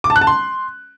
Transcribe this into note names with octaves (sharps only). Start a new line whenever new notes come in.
D6
A5
F#6
A5
C6